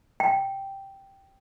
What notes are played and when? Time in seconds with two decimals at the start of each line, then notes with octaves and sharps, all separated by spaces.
0.20 G5